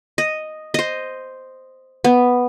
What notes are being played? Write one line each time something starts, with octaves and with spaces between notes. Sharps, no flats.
D#5
C5 D#5
B3